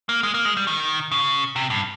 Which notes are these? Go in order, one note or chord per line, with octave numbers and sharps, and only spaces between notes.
A#3
G#3
A#3
G#3
G3
D#3
C#3
C3
G2